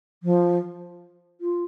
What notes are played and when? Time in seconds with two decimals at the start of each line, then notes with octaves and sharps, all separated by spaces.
0.23 F3
1.41 F4